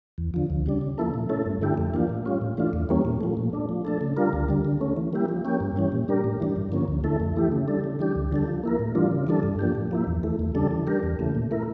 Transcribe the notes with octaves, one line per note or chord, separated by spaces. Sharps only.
E2
D3 F3
D2
C#3 G3 D4
C#3
F3 A#3 E4 A4
A#2
A3 C#4 E4 A4
G2
D3 A3 E4 G4
F2
E3 A#3 D4 F4
A2
G3 C#4 F4
A2
E3 A3 D4 F4
E2
E3 G3 A#3 C#4
A#2
F3 A3
A#2
A3 D4
F3
A3 D4 A4
C#3
G3 D4 F4 A#4
D2
D3 G3
D3
A3 C#4
E3
G3 A#3 E4 G4
F3
A#3 C#4 G4
G2
E3 G3 C#4
A#2
G3 D4 G4 A#4
A2
E3 G3 D4
G2
D3 F3 A#3 C#4
D2
D3 A3 E4 A4
F2
E3 A3 E4 G4
C#3
G3 D4 A4
C#3
E3 G3 D4 G4
D2
D3 G3 D4 A4
F3
A#3 E4 A#4
A2
E3 G3 D4 F4
C#3
E3 G3 D4 A4
G2
F3 A#3 D4 G4
A2
F3 A#3 E4
E2
E3 A3
E2
C#3 G3 D4 A4
E3
G3 D4 G4 A#4
E2
C#3 E3 A3
A#2
A3 E4 A#4